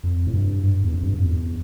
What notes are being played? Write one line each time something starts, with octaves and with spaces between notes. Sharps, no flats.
F2
A2
G2
G2
E2
F2
G2
F2
E2